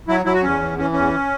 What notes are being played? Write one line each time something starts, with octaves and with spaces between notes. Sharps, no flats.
F#3 E4
F#3 E4
F#4
E2 C#4
E3
E3 C#4
E2 C#4